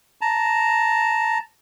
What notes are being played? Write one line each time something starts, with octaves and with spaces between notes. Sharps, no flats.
A5 A#5